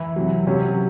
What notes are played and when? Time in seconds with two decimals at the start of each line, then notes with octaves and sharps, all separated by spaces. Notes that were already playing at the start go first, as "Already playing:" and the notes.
Already playing: E3 E4
0.16 C3 F#3
0.47 C3 F#3 C#4